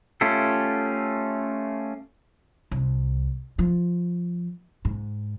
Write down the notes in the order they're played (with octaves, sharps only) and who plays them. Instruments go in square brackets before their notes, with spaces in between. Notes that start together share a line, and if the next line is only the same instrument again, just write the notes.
[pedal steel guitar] A3 C#4 F4 G4 A4
[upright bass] C2
F3
G#2